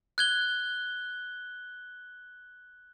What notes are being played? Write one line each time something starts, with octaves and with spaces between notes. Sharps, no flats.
F#6 G#6 G7